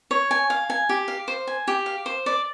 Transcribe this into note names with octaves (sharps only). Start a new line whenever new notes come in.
C#5
G#5
F5
G#5
G4
F5
C5
G#5
G4
F5
C5
D5